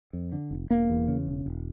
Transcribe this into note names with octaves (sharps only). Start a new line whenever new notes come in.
F2
D3
F1
E1 A#3
E2
C#3
E1
E1